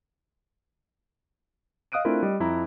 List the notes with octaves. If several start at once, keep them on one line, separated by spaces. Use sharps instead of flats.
D#5 F5 D#6 F#6 D7 D#7
A3 C4 D4 E4 F4 A#4
G3 D#5
F2 E4 A#5